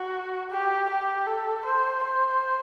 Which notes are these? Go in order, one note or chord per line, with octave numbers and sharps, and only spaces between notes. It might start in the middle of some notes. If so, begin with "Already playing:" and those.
Already playing: F#4
G4
G4
A4
C5
C5